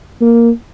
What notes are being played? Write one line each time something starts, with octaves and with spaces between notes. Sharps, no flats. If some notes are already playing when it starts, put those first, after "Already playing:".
A#3